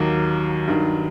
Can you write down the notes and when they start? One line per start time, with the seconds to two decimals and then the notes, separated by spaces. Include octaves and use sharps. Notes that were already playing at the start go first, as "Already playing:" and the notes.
Already playing: D#2 D#3 F#3 A#3
0.68 G2 D#3 F#3